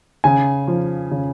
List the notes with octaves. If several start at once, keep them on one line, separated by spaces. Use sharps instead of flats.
C#3 G#5
F3
C#3